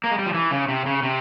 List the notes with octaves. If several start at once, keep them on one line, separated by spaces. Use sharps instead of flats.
A#3
G#3
G3
F3
E3
C#3
C3
C#3
C3